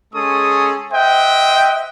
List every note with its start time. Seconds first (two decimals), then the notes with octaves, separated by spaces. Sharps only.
0.14 G#3 C#4 G#4 A4 C#6 D#6
0.92 C5 D#5 E5 F#5 G5